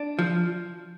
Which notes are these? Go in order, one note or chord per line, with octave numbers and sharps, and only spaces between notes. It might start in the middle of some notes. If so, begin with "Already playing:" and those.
Already playing: D4
F3